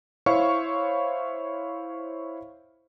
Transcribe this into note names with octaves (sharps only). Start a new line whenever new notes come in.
E4 C5 C#5 F5 C#6